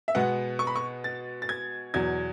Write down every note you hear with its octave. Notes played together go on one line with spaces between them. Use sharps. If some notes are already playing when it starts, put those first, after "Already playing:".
E5
B2 G#3 B3 F#5
C#6
B5
C#6
A6
A6
G#6
E2 B2 F#3 G#6